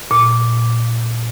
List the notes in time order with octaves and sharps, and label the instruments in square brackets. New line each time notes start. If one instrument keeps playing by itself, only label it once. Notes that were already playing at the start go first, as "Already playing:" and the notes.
[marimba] A#2